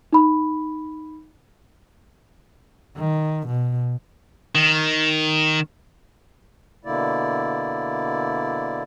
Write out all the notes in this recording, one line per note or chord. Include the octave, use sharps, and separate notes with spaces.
D#4 B5
D#3
B2
D#3
B2 D3 A#3 E4 D5